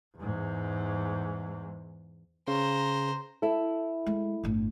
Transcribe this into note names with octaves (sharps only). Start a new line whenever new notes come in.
E2 G#2
C#3 C5 A#5
E4 A4
G#3
G1 A2